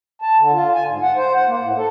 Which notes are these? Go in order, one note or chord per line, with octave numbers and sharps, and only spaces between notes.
A5
D3
F4
G#5
G#2
F#5
C5
F#5
A#3
A2
A4